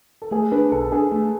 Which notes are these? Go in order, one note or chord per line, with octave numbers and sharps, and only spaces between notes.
A4
A3 G#4
D4 B4
B1 A4
D4 G#4
A3